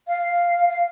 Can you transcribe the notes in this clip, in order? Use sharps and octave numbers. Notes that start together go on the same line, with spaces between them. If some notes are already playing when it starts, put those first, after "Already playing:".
F5
F5